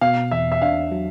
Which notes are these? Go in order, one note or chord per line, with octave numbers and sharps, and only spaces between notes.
B2 F5
E2 E5
E5
D4 F5
F#3